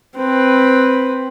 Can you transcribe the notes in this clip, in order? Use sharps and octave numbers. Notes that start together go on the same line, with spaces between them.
C4 B4